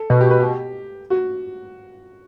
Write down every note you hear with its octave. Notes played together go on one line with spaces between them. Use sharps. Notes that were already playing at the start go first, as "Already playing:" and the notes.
Already playing: A4
B2 B4
G4
B4
G4
F#4